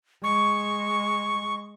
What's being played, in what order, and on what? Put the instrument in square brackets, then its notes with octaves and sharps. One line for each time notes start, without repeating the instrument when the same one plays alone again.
[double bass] G#3 [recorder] C#6